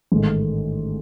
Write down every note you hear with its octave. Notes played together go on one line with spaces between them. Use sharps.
A1 G#2 D#3 A3